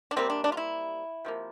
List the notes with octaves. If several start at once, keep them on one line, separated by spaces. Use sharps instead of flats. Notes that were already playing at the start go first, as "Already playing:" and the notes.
D4
C3 G3 A#3 C4
D4
D4
F4
E4
C3 F3 A#3